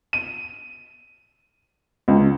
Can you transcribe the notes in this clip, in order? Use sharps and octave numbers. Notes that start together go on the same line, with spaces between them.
D#7
C#2